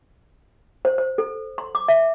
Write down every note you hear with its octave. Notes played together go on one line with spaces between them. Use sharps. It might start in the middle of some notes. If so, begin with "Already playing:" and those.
C5
C5
A4
C6
D6
E5